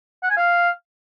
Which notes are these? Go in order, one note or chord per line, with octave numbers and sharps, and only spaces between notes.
F#5
G#5
F5